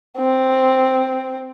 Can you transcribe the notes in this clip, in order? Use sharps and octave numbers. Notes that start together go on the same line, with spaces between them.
C4